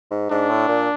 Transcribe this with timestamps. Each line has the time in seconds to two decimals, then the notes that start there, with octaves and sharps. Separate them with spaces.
0.11 G#2
0.30 G#2 D4
0.49 A2
0.68 A#2